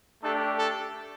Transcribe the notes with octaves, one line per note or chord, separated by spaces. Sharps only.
A3 D4 G4 A4
A4